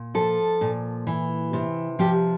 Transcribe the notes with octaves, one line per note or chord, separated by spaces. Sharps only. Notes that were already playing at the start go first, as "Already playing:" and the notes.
Already playing: A#2
F3 A4
A#2
E3
C3
F3 G4